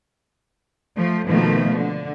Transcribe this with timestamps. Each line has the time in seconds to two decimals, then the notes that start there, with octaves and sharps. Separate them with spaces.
0.96 F3 A3
1.26 B2 D#3 F3 A3 A#3
1.74 D3